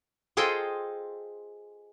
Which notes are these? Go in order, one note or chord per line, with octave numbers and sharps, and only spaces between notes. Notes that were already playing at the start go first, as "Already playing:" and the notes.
F4 G#4 A4 C5 D#5 G5